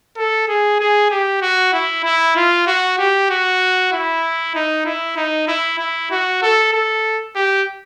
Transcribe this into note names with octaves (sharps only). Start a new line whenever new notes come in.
A4
G#4
G#4
G4
F#4
E4
E4
F4
F#4
G4
F#4
E4
D#4
E4
D#4
E4
E4
F#4
A4
A4
G4